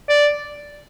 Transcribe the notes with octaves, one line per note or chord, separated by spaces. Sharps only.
D5